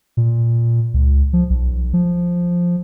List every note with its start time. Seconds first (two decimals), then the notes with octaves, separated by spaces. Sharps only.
0.17 A#2
0.94 C#2
1.33 F3
1.50 B1
1.93 F3